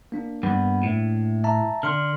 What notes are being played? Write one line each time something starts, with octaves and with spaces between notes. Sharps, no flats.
A#3 D4
G2 B3
A2
E5 A5 A#5
D3 C6 F6